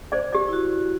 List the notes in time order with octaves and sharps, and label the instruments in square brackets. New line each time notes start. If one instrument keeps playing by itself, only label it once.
[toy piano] C5 D5
G4 D5
[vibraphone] E4 F#4